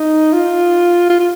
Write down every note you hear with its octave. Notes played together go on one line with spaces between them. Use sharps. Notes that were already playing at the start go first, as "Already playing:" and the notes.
Already playing: D#4
F4
F4
F4